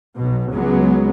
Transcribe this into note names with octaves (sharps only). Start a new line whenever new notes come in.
B1 B2
C#2 F#3 G#3 B3